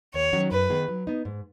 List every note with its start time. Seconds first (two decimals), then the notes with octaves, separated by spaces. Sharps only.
0.14 D#2 C#5
0.33 D#3 F#3 C#4 F#4
0.51 F#2 B4
0.70 D#3 B3 G#4
0.88 F#3
1.07 B3 D#4
1.25 G#2